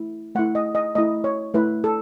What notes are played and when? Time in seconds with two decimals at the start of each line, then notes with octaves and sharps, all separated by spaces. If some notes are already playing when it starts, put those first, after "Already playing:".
Already playing: A3 E4
0.35 A3 E4 F#5
0.55 D#5
0.75 D#5
0.95 A3 E4 D#5
1.24 C#5
1.54 A3 E4 B4
1.84 A4